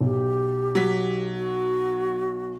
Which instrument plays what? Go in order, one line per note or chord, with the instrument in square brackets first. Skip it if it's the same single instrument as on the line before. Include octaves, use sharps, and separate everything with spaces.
[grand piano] B1 [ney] G4
[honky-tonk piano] F#3 B6
[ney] F#4